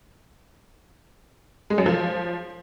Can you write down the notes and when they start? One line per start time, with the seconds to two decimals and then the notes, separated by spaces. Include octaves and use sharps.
1.70 G#3
1.78 F#2
1.86 F3